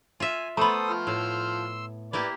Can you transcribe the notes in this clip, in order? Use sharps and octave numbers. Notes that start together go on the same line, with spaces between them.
F4 E5 G#5
A3 B3 A4 C5 A#5 B5 D#6
F3 F6
A2 C6 E6
A#3 E4 G4 B4 D5